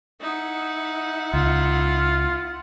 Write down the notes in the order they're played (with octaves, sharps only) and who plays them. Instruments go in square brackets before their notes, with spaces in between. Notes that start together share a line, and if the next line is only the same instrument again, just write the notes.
[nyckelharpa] D#4 [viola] E4 F#5
[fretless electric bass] C#2 [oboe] F4